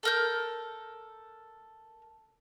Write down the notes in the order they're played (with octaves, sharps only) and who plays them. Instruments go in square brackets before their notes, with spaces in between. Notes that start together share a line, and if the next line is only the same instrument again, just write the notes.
[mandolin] A4 A#4 G6